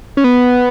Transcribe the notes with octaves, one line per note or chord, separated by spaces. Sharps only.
C#4
B3